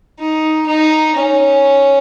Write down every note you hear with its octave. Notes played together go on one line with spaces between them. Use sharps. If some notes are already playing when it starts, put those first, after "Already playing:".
D#4
D#4
C#4